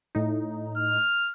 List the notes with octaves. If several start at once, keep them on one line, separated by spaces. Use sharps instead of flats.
A2 D#4
F6